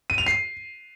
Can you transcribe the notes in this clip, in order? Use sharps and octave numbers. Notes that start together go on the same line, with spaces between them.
D#7
F7
C7